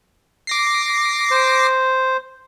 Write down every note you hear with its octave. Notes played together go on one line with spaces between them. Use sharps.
D6 A#6 C7
C5